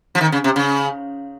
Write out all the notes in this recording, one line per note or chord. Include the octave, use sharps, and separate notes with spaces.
F3
D#3
C#3
C3
C#3